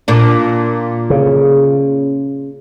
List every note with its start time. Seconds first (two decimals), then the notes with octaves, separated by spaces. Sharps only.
0.08 A#2 D4
1.10 C#3